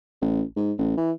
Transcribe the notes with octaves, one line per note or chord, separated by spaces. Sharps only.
A1
G#2
A1
E3